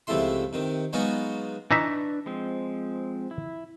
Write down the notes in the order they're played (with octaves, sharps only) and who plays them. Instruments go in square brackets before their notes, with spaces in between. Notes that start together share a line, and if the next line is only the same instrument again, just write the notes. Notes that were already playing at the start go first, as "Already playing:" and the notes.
[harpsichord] C#2 C3 F3 A3 E4 C6
C3 D#3
F#3 G#3 B3 D#4 F4 F#4
[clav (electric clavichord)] E3 D#4 E5 [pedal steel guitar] D4 B4 C#6
[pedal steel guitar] F3 G#3 C4
E4